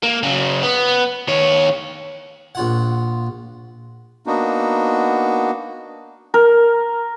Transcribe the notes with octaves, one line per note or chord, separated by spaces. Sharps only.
A#3
C#3 F#3
B3
D#3 C#5
A#1 F4 F#5
A#3 B3 D4 D#4 F#4
A#4